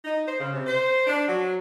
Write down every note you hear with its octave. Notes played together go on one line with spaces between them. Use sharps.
D#4
C5
C#3
C3
C5
D4
F#3